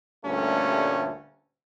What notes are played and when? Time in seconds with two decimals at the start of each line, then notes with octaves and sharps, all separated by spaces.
0.25 D2 G2 A#2 G3 A3 C#4